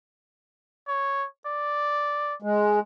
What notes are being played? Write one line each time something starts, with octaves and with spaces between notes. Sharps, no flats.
C#5
D5
G#3